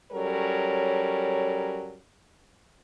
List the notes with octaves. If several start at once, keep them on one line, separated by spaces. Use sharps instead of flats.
F#3 G3 C#4 A4 A#4 C#5